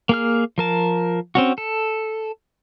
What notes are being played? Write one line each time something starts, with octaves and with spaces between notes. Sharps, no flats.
A#3 G#4 F6
F3 A#4 A5
C4 C#4 F#4
A4